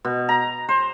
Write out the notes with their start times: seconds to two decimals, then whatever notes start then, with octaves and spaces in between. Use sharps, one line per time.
0.05 B2
0.29 A#5
0.69 C5